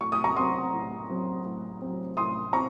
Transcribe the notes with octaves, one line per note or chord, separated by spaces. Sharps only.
A2 C#6
D#6
A#5 C#6
F#3 C4 C6 D#6
A2
F#3 C4
A2
F#3 C4
A2 C6 D#6
C4 A#5 C#6